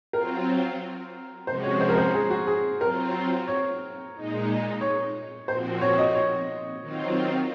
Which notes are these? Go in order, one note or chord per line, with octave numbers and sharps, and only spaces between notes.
F#3 C4 F4 A#4
C3 F3 G#3 C#4 F#4 C5
C#5
C5
A#4
C5
G#4
F#4
G#4
F#3 C4 F4 A#4
C#5
A#2 G#3 D#4
C#5
A#2 F3 C4 F#4 C5
C#5
D#5
C#5
D#3 F#3 C4 F4